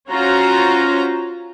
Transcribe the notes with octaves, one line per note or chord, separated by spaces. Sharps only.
C#4 F4 F#4 C5 A#5